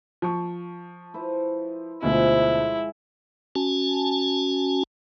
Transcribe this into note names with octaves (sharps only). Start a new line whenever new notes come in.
F3 C#6
E4 B4 C5
D2 B2 F3 G#3 E4
C#4 F#4 G#5 A5